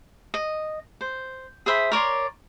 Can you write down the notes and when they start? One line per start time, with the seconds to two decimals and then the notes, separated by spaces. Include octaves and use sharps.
0.34 D#5
1.01 C5
1.66 G#4 C5 E5 B5
1.92 A#4 C#5 D5 C6